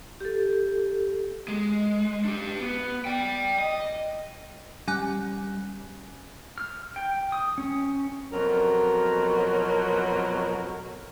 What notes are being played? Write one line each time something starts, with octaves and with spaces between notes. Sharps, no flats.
G4 A4
G#3
D4 G4
B3
D5 G5
D#5
G3 C#4 G#5 F#6
F6
G5
D#6
C#4
F2 B2 F#3 A#4